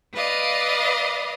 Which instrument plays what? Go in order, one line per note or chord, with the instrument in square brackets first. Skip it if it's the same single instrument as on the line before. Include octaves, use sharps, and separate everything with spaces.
[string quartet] B4 D5 D#5 F5